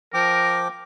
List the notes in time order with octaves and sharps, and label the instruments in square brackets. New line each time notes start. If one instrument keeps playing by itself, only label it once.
[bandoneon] F3 G5 D6 [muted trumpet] A#4